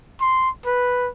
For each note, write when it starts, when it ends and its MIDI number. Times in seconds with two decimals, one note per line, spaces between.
0.21 0.50 84
0.66 1.09 71